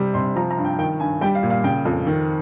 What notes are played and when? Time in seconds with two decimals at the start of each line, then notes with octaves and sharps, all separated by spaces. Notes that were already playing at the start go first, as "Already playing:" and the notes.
Already playing: C3 G3
0.14 C3 C6
0.36 F3 A#5
0.51 A#5
0.58 G2
0.65 G5
0.79 D#3 G5
1.00 G2 G#5
1.21 G3 G5
1.35 F5
1.43 A#2
1.50 F5
1.64 C#3 G5
1.85 F2
2.07 D#3